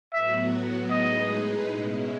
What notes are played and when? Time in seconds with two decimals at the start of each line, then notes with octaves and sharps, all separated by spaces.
0.13 A2 F#3 B3 F#4 E5
0.91 A2 G#3 D#4 G#4 B4 D#5
1.69 B2 G#3 C#4 E4